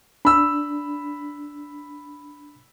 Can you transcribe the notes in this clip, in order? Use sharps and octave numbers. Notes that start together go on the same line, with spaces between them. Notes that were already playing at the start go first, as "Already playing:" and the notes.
D4 B5 E6